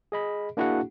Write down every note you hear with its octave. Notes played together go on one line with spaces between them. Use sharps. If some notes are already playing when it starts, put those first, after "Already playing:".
G#4 D#5 B5
A#3 D4 E4 F#4 G#4 F#5